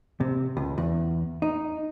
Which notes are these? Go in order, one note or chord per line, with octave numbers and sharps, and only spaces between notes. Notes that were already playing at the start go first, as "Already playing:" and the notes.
C3
C#2
E2
D#4